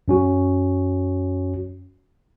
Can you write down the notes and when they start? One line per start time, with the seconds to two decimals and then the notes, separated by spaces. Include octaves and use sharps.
0.08 F#2 C#4 F#4